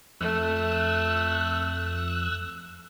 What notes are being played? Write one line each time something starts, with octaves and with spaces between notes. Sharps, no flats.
F2 A3 E6 F#6